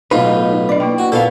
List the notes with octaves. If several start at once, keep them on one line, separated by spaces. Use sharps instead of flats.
B1 A2 D#4 F4 B4 D#5
D4 D5 D#5
A#3 E4 G5
F#4
A#2 A#3 B3 A4 B4 F5